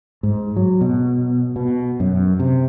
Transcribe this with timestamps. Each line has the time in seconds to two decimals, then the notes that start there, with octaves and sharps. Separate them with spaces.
0.23 G#2
0.56 F#3
0.81 B2
1.56 B2
2.00 F#2
2.39 C3